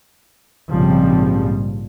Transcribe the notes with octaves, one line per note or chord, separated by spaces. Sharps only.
A#1 G#2 C#3 F3 G3 C4